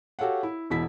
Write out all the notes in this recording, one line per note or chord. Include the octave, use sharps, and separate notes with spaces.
F#4 G4 A4 C#5 F5 F#5
E4
E1 B2 E4 B6